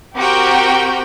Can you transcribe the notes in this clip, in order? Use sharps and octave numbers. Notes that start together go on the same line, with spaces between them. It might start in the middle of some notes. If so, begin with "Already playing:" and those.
C4 F#4 G4 A#4 G5